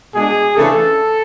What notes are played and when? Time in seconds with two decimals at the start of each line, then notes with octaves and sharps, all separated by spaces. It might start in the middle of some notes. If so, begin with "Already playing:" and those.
0.13 B2 G#3 D4 G#4
0.57 C#3 E3 A3 D4 A4